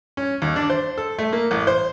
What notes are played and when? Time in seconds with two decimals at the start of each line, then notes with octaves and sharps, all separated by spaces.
0.17 C#4
0.42 D#2
0.56 D4
0.70 C5
0.98 A4
1.19 A3
1.33 A#3
1.51 A1
1.67 C5